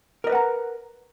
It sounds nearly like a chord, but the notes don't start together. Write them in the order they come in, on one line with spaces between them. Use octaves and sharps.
A#4 D#5 B4 F#5 A#5